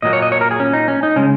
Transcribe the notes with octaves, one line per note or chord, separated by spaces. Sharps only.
A#2 F#3 A#3 D#5
C#5
D#5
C#5
A#4
G#4
C#4
D#4
C#4
D#4
C#3 G#3 C#4